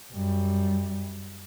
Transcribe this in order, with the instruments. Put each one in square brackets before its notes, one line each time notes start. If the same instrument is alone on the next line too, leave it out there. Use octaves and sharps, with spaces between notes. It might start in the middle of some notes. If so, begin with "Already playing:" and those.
[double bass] F#2 G3